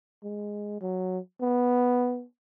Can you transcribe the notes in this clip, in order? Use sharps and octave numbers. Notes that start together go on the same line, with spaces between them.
G#3
F#3
B3